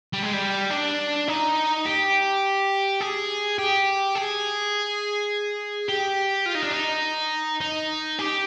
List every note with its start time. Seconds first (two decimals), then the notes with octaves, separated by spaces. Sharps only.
0.13 G3
0.23 G#3
0.33 G3
0.70 D4
1.28 D#4
1.86 G4
3.01 G#4
3.58 G4
4.15 G#4
5.89 G4
6.46 F4
6.55 D#4
6.63 D4
6.71 D#4
7.61 D#4
8.19 G4